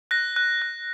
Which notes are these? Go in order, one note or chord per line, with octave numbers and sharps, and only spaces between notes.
F#6 A#6
F#6
F#6